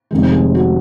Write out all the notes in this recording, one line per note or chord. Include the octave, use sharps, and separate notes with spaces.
F1 F2 D#3 G#3
G#4
F#4